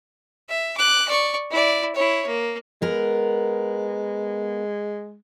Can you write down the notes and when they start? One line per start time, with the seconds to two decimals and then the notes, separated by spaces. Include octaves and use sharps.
0.49 E5
0.77 D6 F#6
1.08 D5 C#6
1.51 E4 D5
1.95 E4 C#5
2.27 A#3
2.82 G#3 B3 A#4